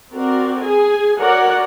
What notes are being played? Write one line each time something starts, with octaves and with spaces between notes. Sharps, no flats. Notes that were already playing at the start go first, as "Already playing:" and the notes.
C4 F#4 A#4 D5
G#4 G#5
F#4 A#4 C#5 D5 F#5